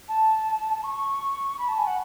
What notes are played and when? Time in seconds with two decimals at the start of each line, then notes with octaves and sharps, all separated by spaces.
0.08 A5
0.83 C#6
1.58 B5
1.67 A5
1.77 G#5
1.86 F#5